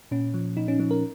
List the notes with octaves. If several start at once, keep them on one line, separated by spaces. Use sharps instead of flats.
A#2 C#4
F3
A#2 D#4
C#4
F3 C#4
A#4